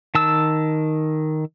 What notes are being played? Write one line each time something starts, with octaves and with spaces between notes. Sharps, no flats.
D#3 A5 E6